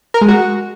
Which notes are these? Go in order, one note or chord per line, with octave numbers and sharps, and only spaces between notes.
A#4
G#3
F#4